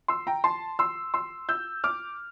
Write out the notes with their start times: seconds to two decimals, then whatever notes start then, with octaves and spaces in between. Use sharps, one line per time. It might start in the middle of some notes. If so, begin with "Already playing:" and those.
0.08 C6 E6
0.27 G5 A#5
0.44 A5 C6
0.79 C6 E6
1.14 C6 E6
1.49 E6 G6
1.84 D6 F6